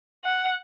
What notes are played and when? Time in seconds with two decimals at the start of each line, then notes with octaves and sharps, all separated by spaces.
0.25 F#5